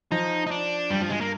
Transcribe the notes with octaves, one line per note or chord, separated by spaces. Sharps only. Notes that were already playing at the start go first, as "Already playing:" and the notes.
F3 D#4
D#4
D4
G2 G3
F3
G#3
A#3